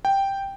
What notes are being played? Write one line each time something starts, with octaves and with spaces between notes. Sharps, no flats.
G5